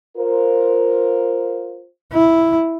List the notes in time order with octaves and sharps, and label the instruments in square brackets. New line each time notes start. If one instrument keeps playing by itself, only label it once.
[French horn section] F4 A#4 C5
[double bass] E4